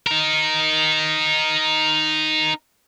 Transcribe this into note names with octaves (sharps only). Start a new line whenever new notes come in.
D#4 A#4